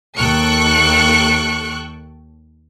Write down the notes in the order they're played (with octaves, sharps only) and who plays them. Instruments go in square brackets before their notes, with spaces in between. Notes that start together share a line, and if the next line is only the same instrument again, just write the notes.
[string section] D#2 A4 G5 C#6 F#6 C#7